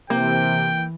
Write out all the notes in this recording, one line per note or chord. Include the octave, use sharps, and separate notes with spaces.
C3 E3 A#3 G5